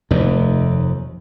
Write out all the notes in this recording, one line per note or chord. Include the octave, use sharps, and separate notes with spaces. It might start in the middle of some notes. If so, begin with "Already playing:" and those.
F1 D#2